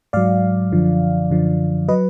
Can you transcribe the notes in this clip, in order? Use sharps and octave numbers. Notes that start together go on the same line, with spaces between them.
G#2 F#3 D5 F5
F#2 D3 F3
F#2 D3 F3
F#3 B4 D#5